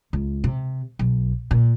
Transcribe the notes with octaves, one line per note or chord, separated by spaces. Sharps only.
C#2
C3
B1
A#2